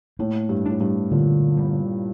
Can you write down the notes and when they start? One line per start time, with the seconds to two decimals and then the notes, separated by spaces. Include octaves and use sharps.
0.19 A2 A#3
0.49 G2
0.65 D4
0.71 A2
0.81 G2
1.11 A#2 D3
1.58 G3